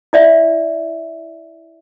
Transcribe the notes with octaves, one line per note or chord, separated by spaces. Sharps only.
E4 D5 E5